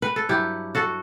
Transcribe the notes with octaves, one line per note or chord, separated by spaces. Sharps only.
B4
A4
G2 F#3 E4 G4
F#4 A4